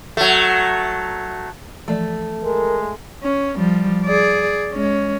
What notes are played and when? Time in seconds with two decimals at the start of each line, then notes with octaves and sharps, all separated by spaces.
0.17 F#3 A3
1.88 E3 F3 A3 D5
2.43 G#3 A#4
3.23 C#4
3.57 F3 G3
4.05 G#4 D5
4.73 G#3 C#4